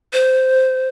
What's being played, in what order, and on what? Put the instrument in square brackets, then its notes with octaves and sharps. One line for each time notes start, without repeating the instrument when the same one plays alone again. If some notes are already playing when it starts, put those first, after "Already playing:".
[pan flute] C5